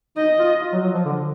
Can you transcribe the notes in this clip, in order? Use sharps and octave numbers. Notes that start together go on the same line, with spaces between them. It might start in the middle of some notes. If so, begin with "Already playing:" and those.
D#4 D#5
F4
F4
F#3
F#3
F3
D3